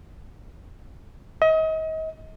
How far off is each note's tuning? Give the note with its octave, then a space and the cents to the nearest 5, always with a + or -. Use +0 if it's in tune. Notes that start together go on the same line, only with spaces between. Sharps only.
D#5 +35